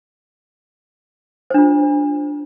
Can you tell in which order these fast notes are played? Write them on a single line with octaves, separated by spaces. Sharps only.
C5 D4 F4